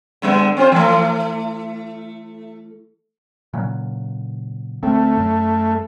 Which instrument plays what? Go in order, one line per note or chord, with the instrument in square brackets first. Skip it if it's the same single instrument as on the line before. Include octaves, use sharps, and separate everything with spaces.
[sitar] D3 G3 B3
C4 F4 C5
E3 A3
[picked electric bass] A#2 C#3 F#3
[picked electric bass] D2 C4 [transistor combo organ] A3
[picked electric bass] F#2